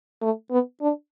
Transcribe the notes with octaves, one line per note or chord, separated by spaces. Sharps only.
A3
B3
D4